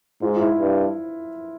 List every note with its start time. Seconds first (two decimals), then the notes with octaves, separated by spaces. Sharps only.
0.22 G#2 F4
0.36 F4
0.41 E4
0.59 G2